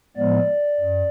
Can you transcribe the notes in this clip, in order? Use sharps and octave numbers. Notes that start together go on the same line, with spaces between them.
A2 F3 G#3 B3 D5
F#2